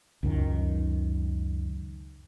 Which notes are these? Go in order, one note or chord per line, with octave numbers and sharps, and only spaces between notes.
C#2 F#2 D#3